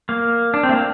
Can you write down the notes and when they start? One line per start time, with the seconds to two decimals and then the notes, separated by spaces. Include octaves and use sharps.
0.09 A#3
0.54 D4
0.63 C4
0.69 A3
0.73 A#3